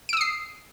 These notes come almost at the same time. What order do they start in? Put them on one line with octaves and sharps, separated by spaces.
D7 E6 D#6 C7